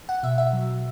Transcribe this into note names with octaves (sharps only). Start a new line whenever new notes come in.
F#5
B2 E5
E5
F#3